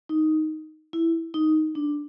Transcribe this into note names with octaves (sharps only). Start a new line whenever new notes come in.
D#4
E4
D#4
D4